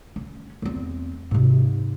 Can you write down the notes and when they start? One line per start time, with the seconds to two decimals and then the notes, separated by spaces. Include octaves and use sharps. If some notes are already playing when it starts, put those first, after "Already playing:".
0.16 C#4
0.62 E2 C4
1.31 G#2 C3